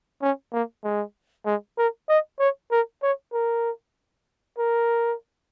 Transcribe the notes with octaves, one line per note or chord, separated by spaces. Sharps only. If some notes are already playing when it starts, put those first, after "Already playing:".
C#4
A#3
G#3
G#3
A#4
D#5
C#5
A#4
C#5
A#4
A#4